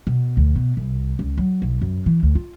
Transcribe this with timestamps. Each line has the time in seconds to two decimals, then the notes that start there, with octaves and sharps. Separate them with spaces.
0.07 B2
0.37 D2
0.56 B2
0.77 C2
1.19 C#2
1.38 F#3
1.62 B1
1.82 F#2
2.06 E3
2.23 D2
2.35 F4